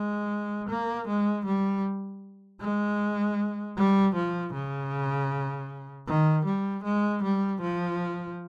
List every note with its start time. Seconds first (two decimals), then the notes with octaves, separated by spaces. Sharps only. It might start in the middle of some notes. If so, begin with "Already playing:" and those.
Already playing: G#3
0.69 A#3
1.08 G#3
1.46 G3
2.61 G#3
3.77 G3
4.15 F3
4.53 C#3
6.07 D#3
6.45 G3
6.84 G#3
7.23 G3
7.61 F3